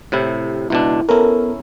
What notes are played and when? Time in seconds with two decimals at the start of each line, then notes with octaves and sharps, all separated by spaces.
0.12 A2 C3 E4
0.70 C#2 B2 D4 E4
1.09 B3 C#4 E4 A4 A#4